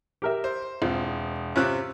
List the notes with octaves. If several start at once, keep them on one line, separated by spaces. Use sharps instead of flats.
G4 A#4 E5
C5
E1 C4 F4
C3 C4 C#4 F4 F#6